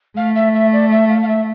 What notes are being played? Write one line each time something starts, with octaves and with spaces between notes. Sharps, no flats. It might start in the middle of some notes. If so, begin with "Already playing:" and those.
A3 F5
E5
E5
D5
E5
F5
F5
E5